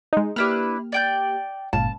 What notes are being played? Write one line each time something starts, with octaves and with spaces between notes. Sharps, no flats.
G#3 D#4
A#3 D4 E4 G4 B4 F6
D5 G5 G6
G1 C#2 A#2 F5 A5